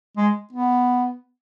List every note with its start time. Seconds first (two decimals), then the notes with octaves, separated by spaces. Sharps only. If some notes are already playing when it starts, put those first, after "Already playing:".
0.17 G#3
0.52 B3